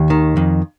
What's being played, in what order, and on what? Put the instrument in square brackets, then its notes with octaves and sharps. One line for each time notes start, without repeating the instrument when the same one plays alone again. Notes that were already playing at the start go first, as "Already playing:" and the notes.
Already playing: [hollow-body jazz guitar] D#2
D#3
F2